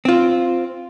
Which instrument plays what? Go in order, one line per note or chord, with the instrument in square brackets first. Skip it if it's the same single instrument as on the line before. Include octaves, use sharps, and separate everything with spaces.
[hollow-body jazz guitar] C4 F4